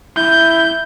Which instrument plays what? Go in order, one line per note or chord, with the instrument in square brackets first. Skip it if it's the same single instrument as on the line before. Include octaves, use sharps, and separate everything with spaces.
[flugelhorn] E4 [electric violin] G6